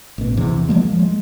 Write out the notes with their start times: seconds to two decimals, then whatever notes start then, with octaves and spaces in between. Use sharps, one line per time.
0.18 A1 B2
0.37 E2 C3
0.69 F3 G#3 A#3
0.99 G#3